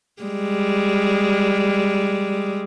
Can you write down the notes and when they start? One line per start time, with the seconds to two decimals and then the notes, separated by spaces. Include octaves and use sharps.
0.22 G3 G#3